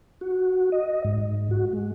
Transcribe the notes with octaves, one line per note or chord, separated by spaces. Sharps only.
F#4
D#5
G#2
F#4
G#3